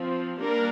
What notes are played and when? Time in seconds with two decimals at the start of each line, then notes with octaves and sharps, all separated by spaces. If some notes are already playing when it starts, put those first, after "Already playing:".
Already playing: F3 C4
0.38 G3 A#3 D4 A#4